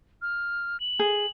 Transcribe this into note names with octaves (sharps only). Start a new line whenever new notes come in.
F6
F#7
G#4